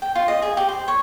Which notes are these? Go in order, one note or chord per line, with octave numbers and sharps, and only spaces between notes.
G5
F4
D#5
G#4
G4
C5
C#5